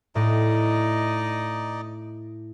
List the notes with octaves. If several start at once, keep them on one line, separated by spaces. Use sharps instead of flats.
A2 D#4 D5 D#5